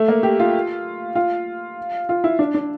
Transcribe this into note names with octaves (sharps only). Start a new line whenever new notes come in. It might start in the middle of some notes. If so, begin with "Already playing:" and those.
Already playing: A3
A#3
G4
F4
F4
F4
E4
D4
D4